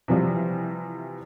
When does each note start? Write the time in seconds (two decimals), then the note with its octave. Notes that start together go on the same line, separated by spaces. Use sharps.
0.08 C3 E3 F3 G3